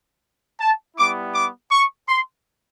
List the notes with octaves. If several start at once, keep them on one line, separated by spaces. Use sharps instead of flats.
A5
G3 B3 E4 D6
D6
C#6
C6